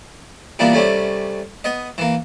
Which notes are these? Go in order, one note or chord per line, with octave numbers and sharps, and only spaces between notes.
A#2 E3 G3 A#3 B3
C3 G3 A3 C#4
B3 D#5
E3 A#3